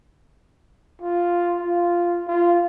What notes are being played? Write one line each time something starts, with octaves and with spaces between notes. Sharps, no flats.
F4
F4
F4